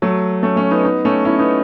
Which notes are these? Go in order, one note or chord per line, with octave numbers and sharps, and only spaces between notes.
F#3 A3
A3 C#4
A3 C#4
B3 D#4
B3 D#4
A3 C#4
C#4 E4
B3 D#4